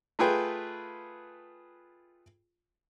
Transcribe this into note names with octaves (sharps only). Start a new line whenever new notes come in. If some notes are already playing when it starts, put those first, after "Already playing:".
A3 F4 G#4 B4 G5